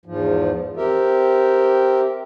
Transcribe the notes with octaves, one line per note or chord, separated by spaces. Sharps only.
E2 G#2 F3
C4 G4 A#4 E5